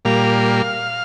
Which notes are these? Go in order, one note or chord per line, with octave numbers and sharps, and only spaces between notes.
A#2 G3 A#3 F5